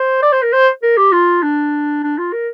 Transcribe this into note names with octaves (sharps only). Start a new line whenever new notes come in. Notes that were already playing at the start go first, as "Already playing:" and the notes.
Already playing: C5
D5
C5
A#4
C5
A#4
G4
F4
D4
D4
F4
A#4